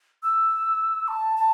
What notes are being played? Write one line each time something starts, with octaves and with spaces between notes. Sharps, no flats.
E6
A5
A5